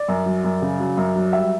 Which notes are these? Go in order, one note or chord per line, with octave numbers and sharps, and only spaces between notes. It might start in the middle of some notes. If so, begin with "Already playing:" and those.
Already playing: D5
F#2
F#3
F#2
C#3
F#3
F#2
F#3
G3 E5